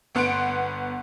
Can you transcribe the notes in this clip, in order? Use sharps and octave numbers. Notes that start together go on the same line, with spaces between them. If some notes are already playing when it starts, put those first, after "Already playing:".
G1 B3 F#5 C6 D7